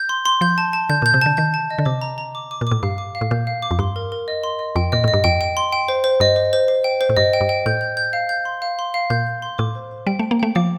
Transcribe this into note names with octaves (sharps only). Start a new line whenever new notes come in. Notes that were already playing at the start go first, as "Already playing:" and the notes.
Already playing: G6
C6
C6
F3 G6
A5
A5
D3 G6
A#2 G6
C3
D3 A5
D#3 G6
A5
D#5
D3
C3 D6
A#5
A#5
D6
D6
A#2
A2 D6
G2 F5
D6
F5
A2
A#2 G6
F5
D6
F2
G2 C6
A#4
A#4
D#5
C6
D#5
F2 G5
A#2 D#5
A2 D#5
G2
F2 G5
G5
C6
G5
C5
C5
G2 D#5
C5
C5
C5
G5
C5
A2
G2 D#5
G5
G2
G5
A2 G6
G6
G6
F5
G6
C6
F5
C6
F5
A#2 G6
G6
C6
A2 D6
C5
C5
G3 G5
A3
G5
A#3
A3 G5
F3 D6